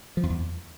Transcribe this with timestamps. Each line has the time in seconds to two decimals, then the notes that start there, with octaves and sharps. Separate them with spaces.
0.17 F3
0.23 F2
0.30 E2